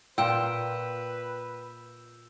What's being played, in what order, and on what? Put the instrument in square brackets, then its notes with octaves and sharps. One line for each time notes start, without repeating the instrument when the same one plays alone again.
[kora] A#2 F4 [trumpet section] B4 [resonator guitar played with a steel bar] G5 [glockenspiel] E6 G6 E7